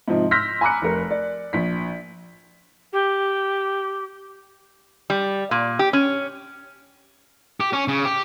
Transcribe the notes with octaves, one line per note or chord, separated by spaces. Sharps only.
G#2 C3 F3 D#4
C6 E6 F6 G6 A#6 B6
G#5 A#5 B5 D6 F#6 C#7
F1 A#4
D5
A#1 B6
G4
G3
A#2
G4
C#4
G4
C#4
C#3
G4